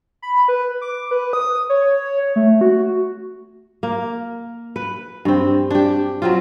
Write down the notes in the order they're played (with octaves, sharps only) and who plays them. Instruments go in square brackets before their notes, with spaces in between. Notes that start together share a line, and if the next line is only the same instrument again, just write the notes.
[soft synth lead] B5
B4
D6
B4
D#6
C#5
A3
F#4
[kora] A#3
B4
G2 C4
D4 G4
F#3 C4 F4